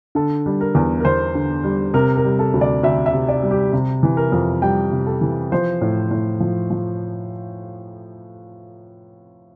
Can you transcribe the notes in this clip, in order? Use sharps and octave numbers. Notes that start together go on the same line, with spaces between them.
D3 A4
G3
A#4
E2
A#4
E2 C5
D3
G3
C3 A#4
A#4
G3
A4
D2
D5
D2 E5
E5
C3
D5
G3
G4
C3
E3
A#4
F2
G3 G5
C3
A4
E3
F3 C5
A2
A2
F3
F3